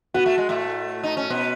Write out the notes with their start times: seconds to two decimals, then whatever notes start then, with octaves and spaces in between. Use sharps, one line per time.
0.14 B3 F#4
0.26 A3
0.38 G#3
0.49 A2 A3
1.04 D#4
1.17 C#4
1.30 B2 B3